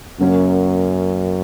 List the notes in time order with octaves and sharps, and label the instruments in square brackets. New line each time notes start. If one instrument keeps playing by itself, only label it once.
[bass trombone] F#2 [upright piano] C#3 F#3 A#3 C#4